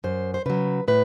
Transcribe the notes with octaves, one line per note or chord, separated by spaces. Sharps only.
F#2 C5
C5
C#3 F#3 B4
A2 B4